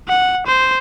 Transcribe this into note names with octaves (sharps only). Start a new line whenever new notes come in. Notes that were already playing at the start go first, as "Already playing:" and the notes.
F#5
C5